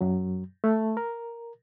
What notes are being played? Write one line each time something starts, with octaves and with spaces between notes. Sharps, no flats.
F#2 F#3
A3
A#4